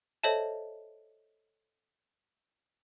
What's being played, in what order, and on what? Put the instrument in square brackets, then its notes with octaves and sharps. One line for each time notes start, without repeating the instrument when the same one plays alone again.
[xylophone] A4 C5 C#5 D#5 E5 A5